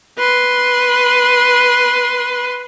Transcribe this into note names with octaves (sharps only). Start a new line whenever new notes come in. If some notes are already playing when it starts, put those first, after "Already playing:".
B4 C6